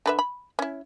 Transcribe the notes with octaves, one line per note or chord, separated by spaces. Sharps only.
D3 B4 E5
B5
C#4 E4